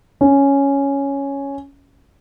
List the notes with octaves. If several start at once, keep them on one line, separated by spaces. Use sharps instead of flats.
C#4